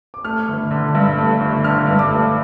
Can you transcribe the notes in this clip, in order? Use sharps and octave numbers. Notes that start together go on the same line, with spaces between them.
D6
A3 F6
G1
D3
G2
A3
G1
D3 F6
G2
D6
A3